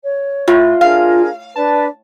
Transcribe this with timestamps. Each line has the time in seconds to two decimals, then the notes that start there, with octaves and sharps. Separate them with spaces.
0.01 C#5
0.48 A2 F4
0.81 D4 G#4 A#4 F5
1.56 D4 B4 D5 A5